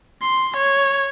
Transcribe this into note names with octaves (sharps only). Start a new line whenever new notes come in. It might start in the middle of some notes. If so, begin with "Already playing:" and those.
C6
C#5